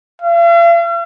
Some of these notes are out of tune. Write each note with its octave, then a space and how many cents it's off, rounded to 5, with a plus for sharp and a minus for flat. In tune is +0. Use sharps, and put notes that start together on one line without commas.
F5 -45